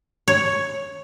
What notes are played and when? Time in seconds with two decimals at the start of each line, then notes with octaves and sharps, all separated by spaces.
0.28 C#5